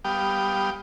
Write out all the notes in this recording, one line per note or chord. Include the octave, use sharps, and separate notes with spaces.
G3 B3 G4 F5 G5 D#6